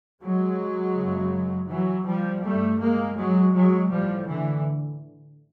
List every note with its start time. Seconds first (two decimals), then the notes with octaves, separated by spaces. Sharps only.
0.21 F#3 G#3
0.94 F#1 F#2 C#3
1.68 E3 F#3
2.05 F3 G3
2.42 A1 G2 G3 A3
2.79 G#3 A#3
3.16 F#3 G#3
3.53 F#3 G#3
3.89 A1 A2 F3 G3
4.25 D3 E3